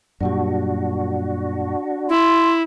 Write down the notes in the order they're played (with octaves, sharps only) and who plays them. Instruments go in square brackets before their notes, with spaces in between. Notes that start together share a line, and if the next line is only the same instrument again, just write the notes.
[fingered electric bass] F#2 A#2 G3 [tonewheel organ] D4 F#4
[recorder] E4 [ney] C6